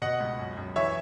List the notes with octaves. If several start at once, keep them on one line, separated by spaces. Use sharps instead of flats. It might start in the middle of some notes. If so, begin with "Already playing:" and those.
B2 D#5 F#5
C#2
F#2
F#2
E3 C#5 E5